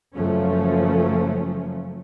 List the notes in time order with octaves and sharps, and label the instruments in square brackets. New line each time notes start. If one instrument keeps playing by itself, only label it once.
[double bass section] F#1 F3 F#3 A3 C#4